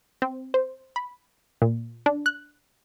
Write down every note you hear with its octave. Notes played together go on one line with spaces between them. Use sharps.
C4
C5
B5
A#2
D4
F#6